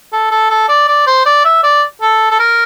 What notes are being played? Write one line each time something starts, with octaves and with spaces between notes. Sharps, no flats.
A4
A4
A4
D5
D5
C5
D5
E5
D5
A4
A4
A#4